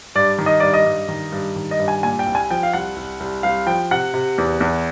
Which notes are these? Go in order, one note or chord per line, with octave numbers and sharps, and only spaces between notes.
G2 D5
D#3
D#5
G2 D5
D#5
G2
D#3
G2
D#3
D#5
G2
G#5
A#2 G#5
G5
C2
G#5
F3 G5
F5
C2 F#5
C2
C2
C2 F5
F3 G5
C3 F#5
C3
E2
E2